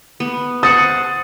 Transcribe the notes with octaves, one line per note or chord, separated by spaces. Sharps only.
B3
C5 F#5 C#6 D#6 A6